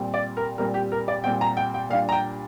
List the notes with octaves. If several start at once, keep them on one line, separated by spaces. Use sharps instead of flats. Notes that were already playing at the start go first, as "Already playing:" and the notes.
Already playing: A#2 G3 C4
D5
A#4
A#2 G3 C4 A#4
G4
A#4
D5
A#2 G3 C4 G5
A#5
G5
G5
A#2 G3 D4 F5
A#5
G5